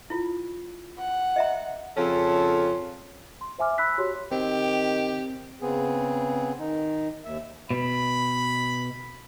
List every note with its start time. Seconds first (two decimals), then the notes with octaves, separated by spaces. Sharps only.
0.10 E4 F4
0.98 F#5
1.36 D#5 E5 A#5
1.97 F2 C#3 C#4 F4 A4
3.41 C6
3.59 C5 E5 G#5 D6 F6
3.78 B5 E6 F#6 B6
3.98 F#4 G4 C#5 C6
4.32 D#3 C4 G4
5.62 C#3 B3 C4 G#4
6.59 D#3 D#4
7.25 D#2 E5
7.71 B2 B5